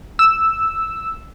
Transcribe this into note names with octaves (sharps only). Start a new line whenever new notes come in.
E6